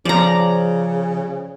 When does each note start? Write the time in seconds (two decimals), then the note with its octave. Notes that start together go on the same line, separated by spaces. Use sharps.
0.05 C#3 F3 D5 A#5